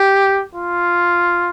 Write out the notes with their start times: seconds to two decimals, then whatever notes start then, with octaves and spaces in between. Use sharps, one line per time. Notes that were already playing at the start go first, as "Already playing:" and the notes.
Already playing: G4
0.55 F4